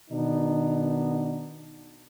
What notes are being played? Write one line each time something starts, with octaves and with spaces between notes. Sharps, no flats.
B2 D#3 B3 D4 D#4